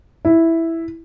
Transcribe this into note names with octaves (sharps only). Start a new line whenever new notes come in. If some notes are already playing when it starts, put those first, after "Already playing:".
E4